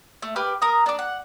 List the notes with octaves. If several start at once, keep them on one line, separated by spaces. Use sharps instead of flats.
A3
G4 B4 D6 F6
A#4 A#5 D#6
D4 D6
F#5